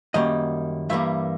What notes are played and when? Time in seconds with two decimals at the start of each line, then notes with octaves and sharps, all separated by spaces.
0.14 F#2 D#3 G3 A#3 D#5
0.89 G2 E3 G3 A#3 E5